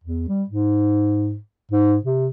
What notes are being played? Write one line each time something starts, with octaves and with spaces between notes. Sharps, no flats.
E2
G3
G#2
G#2
C3